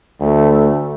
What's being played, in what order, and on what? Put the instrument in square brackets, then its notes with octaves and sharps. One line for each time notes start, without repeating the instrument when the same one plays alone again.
[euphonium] D2 [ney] A3